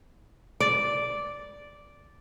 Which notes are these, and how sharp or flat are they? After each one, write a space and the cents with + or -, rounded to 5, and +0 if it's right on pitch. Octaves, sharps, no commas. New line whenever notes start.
D5 -5